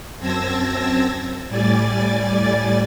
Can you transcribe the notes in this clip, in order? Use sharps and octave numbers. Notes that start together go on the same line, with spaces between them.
F#2 C4 A5 E6 G#6 A#6
A2 G3 D5 G#5 A6